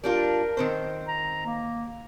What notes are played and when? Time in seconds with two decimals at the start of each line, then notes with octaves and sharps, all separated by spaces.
0.04 G3 D4 F4 A#4
0.57 D#3 C4 C5
1.08 A#5
1.46 A#3